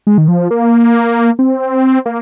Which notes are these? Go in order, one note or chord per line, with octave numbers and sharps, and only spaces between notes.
G#3
D#3
F3
A#3
C4
A#3